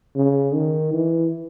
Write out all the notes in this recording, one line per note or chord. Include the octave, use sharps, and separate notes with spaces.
C#3
D#3
E3